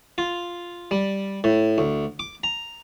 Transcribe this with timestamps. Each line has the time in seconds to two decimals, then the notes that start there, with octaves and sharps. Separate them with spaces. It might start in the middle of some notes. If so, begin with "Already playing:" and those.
0.18 F4
0.91 G3
1.44 A2
1.78 D2
2.19 D6
2.44 A#5